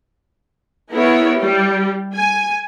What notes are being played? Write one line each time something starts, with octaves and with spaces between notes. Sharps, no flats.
B3 E4 G#4 A#4 C#5
G3 G4
G#5